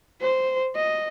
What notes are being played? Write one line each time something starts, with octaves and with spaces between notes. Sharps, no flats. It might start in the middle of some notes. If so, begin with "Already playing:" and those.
C5
D#5